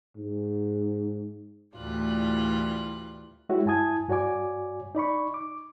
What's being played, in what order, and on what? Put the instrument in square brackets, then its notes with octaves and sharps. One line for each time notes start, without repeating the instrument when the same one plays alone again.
[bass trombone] G#2
[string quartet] D2 A2 E3 G3 F4 F#6
[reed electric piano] G#3 E4 F#4 G4 C#5 E5
G2 E4 G#5 A5 D#6 G#6
G2 F#4 C#5 D5 G#5 D6
D#4 D5 B5 C#6
D6